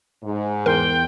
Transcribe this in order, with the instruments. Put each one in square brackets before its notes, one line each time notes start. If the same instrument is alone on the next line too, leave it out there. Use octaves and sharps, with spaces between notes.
[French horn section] G#2
[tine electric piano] E2 C6 [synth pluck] A#4 [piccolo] G5